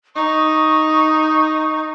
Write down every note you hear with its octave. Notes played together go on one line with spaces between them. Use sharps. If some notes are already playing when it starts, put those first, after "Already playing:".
D#4 C#6